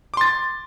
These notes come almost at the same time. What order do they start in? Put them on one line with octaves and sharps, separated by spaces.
D6 C6 A6